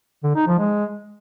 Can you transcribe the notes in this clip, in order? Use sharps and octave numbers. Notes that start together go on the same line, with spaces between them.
D3
D#4
F3
G#3